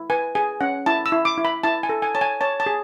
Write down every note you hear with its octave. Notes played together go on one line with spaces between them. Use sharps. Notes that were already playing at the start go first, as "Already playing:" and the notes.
Already playing: E4
B4 G#5
G#4 G#5
C#4 F#5
E4 A5
E6
E4
D6
E4
B5
E4 A5
G#5
A4
G#5
C#5 A5
G#5
C#5 A5
A5
G#4